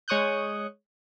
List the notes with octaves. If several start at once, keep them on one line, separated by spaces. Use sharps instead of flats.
G#3 C#5 C#6 D#6 F#6 G6